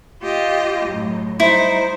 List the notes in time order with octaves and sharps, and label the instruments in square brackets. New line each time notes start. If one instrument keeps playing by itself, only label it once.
[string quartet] F4 G4 D#5
F#2 A2
[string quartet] G3 D#4 C5 [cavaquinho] E4